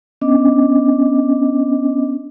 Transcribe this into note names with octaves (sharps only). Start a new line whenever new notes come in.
B3 C#4 D4 D#5 D6